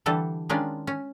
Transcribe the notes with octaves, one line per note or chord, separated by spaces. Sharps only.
D3 E3 G3 A4
D#3 G#3 C#4 D4 F4
C#4